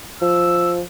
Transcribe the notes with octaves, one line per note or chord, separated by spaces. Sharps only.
F3 E6